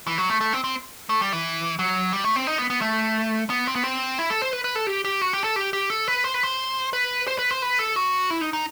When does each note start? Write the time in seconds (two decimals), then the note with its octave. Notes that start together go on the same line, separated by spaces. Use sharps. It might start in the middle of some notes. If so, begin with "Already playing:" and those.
0.07 E3
0.18 F#3
0.30 A3
0.41 A3
0.53 C4
0.64 C4
1.09 A3
1.21 G3
1.33 E3
1.79 F#3
2.13 G3
2.24 A3
2.36 C4
2.47 D#4
2.58 B3
2.70 B3
2.81 A3
3.50 B3
3.67 C4
3.75 B3
3.84 C4
4.19 E4
4.30 A4
4.42 C5
4.53 B4
4.64 B4
4.75 A4
4.87 G4
5.05 G4
5.21 F#4
5.33 G4
5.44 A4
5.56 G4
5.73 G4
5.90 A4
6.08 B4
6.24 C5
6.34 B4
6.43 C5
6.93 B4
7.27 C5
7.39 B4
7.51 C5
7.62 B4
7.79 A4
7.96 F#4
8.30 E4
8.41 D#4
8.53 D#4